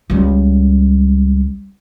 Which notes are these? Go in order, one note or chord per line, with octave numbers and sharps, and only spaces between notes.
C#2 G3